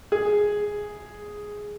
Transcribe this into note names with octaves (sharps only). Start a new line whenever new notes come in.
G#4